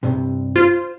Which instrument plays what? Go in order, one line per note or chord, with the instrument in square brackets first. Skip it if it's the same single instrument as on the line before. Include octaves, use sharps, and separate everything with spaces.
[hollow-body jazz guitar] C2 G2 C3
[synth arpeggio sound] F4 [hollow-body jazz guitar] C5